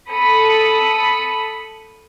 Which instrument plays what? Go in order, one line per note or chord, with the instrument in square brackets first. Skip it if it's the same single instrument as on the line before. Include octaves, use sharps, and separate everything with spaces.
[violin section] A4 B5 D#6 C#7